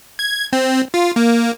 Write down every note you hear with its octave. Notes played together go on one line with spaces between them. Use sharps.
G#6
C4
F4
A#3